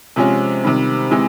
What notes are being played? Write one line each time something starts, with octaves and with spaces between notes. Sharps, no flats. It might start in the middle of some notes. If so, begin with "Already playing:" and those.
C3 F3 G#3 C#4
C3 D#3 G3
C3 E3 G#3